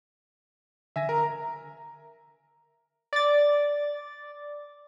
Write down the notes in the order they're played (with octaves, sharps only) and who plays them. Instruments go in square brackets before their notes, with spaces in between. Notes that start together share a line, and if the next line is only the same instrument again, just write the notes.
[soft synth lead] D3 [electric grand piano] E5 G#5 A#6
[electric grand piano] A#4 [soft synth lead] A#5
[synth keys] D5 A6